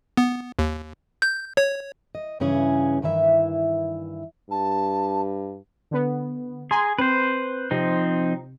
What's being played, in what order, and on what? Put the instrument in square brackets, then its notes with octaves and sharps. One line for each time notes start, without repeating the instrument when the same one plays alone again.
[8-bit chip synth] B3
D#2
G6
C#5
[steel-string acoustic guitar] D#5
G2 C#3 E3 C#4 G#4
G2 D#3 E3 E4 E5
[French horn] G2 [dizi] A5
[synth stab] D3 B3
[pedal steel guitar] G#4 [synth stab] G#5 A#5 C6
[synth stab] C4 [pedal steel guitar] B4 C5
[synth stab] C3 [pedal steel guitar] F3 C4 D#4